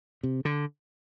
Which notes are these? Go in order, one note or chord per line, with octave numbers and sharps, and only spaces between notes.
C3
D3